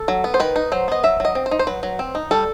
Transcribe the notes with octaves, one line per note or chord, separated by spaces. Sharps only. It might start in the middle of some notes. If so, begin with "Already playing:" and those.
Already playing: A4
F#3
B3
C5
D#3 B4
D#4
F#3 C5
B3 D#5
F#3 E5
F#3 D#5
C4
C5
D#4
C5
F#3 B4
F#3
C4
D#4
G3 A4